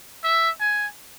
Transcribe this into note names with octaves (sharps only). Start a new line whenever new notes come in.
E5
G#5